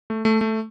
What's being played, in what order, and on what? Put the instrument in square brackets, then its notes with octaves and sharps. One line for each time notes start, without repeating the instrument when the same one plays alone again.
[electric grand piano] A3
A3
A3